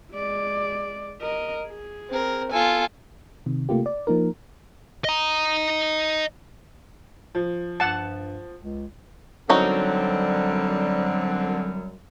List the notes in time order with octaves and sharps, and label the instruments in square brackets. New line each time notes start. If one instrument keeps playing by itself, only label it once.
[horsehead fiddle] G#3 D5
A#4 D#5
G#4
[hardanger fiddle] C4 A#4
[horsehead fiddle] B3 A4 [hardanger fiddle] F4 G#5
[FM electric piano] C3 D#3
C3 A3 A#3 F4 G4
D5
F3 A#3 D#4 A#4
[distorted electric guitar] D#5 A#5
[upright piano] F3
[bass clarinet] G2 [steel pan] F#5 A5
[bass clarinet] C#2
[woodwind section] F#2 F#3 G3 [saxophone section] D3 C4 [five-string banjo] C#4 D#4 F#4